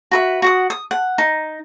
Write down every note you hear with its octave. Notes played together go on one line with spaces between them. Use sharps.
F#4 B4 E5
F#4 F#5 D#6
D#6
F#5
D#4